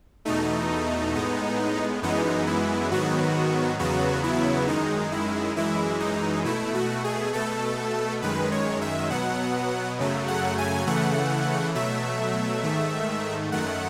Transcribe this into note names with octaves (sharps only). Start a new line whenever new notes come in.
E2 B2 A3 D#4
A2 G#3 B3
F#2 E3 G#3 B3 D#4
E4
G#2 D#3 F#3 B3 F#4
E2 C#3 F#3 B3 F#4
E4
F#2 D#3 G#3 D#4
E4
F#2 E3 G#3 E4
D#4
B2 A3 E4
F#4
G#4
B2 A3 A4
F#2 D#3 G#3 B4
C#5
E5
B2 F#3 B3 F#5
F#2 C#3 F#3 A3
F#5
G#5
C#3 E3 A3 F#5
B2 F#3 A3 E5
G#2 D#3 A3
F#2 D#3 A3 F#5